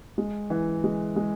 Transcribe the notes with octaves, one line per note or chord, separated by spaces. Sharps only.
G#3
E3
G#3
G#3